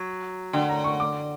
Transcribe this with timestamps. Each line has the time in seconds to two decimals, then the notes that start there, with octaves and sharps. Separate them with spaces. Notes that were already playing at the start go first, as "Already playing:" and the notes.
Already playing: F#3
0.53 D3 G5
0.69 A#5
0.84 C#6
1.00 D6